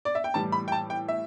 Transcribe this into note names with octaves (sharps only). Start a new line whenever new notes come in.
D5
E5
G5
A2 E3 G3 A5
B5
G5
A5
G5
E5